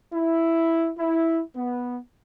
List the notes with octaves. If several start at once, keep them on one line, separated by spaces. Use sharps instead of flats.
E4
E4
B3